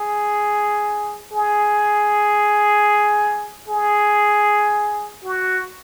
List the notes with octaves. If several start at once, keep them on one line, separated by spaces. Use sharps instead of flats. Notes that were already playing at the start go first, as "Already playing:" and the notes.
Already playing: G#4
G#4
G#4
F#4